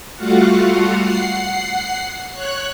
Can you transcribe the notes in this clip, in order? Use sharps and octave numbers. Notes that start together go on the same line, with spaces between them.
G3 A3 F4 F#4 F5 F#5
F#5 C7
C#5 F#6